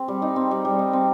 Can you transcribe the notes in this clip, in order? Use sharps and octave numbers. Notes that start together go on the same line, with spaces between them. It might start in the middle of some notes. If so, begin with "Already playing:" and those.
Already playing: C4
G3
D#4
C4
G3
G3
D#4
C4